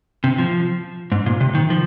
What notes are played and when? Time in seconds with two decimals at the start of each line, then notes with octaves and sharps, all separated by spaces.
0.24 C3
0.38 F3
1.12 G#2
1.26 A#2
1.41 C3
1.55 D#3
1.70 F3